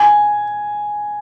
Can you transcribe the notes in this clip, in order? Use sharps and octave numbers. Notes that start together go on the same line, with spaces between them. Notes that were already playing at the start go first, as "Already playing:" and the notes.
Already playing: G#5